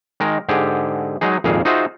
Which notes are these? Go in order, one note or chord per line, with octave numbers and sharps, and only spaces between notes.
D#3 G#3 A#4
G#2 D3 G4 G#4
F#3 G#3 D#4 G#4
G#1 F2 A#2 G#4 F5
D#4 F4 F#4 G#4 C5 E5